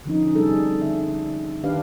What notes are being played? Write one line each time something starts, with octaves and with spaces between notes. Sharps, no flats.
D3 F3 C#4 D#4
C3 G3 D4 G#4 A4
D3 E5
D#3 D4 G4 B4 F5